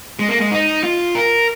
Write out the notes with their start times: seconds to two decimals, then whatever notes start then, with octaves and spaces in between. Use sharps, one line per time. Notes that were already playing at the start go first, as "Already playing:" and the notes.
0.19 G#3
0.29 A#3
0.39 G#3
0.51 D#4
0.84 F4
1.15 A#4